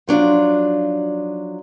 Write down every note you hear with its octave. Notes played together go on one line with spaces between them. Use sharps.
F3 F#3 D4 D#4 F4